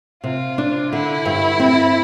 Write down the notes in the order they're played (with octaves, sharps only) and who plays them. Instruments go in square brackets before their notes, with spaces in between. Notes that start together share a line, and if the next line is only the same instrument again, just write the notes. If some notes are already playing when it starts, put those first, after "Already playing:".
[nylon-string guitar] C3 [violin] F4
[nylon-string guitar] D4
[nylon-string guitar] D3 [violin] E4
[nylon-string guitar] G2
C4